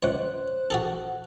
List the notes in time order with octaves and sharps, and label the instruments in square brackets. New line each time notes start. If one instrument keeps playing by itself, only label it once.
[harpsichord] C#2 C#5 [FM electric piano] C5 F#6
[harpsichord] F#4 G#4 A4